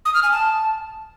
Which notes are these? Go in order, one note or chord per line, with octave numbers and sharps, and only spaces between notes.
D#6
F6
G#5
A5